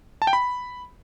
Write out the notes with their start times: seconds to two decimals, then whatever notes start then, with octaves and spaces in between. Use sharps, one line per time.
0.22 A5
0.27 G5
0.33 B5